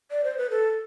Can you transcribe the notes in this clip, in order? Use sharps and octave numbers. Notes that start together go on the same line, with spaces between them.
D5
C5
B4
A4